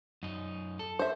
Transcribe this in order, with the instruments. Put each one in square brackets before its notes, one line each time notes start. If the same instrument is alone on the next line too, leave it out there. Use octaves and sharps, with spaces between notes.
[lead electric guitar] F#2 D#4
A4
[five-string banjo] C5 E5